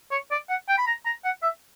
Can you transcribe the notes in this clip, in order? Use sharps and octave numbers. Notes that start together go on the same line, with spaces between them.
C#5
D5
F#5
G5
B5
A#5
A#5
F#5
E5